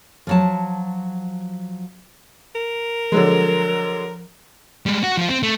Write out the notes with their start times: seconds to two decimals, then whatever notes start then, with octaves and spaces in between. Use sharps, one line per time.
0.27 F3 F#3 A5
2.55 A#4
3.12 D3 F3 F#3 G#3
4.86 G3 G#3
5.03 F#4
5.17 F3 F4
5.29 C4
5.43 A3